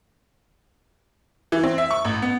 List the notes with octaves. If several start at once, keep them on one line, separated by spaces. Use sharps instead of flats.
E3
C4
E5
C#6
A1
B3